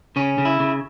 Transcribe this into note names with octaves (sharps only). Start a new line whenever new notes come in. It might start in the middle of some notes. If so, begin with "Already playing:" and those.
C#3 C#4
C#3
E4
C#3